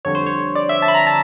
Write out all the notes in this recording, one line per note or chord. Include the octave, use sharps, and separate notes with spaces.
F2 D3 G3 C#5
C5
C#5
D5
E5
A5
B5
A#5
A5